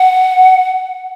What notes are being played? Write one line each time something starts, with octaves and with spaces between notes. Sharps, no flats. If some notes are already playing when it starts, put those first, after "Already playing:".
Already playing: F#5